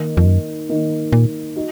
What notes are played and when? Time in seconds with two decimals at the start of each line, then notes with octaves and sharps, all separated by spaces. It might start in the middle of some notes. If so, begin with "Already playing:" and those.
Already playing: D#3 A#3 D#4
0.17 F2
0.25 F#2
0.69 D#3 A#3 D#4
1.12 A#2
1.56 D#4 F#4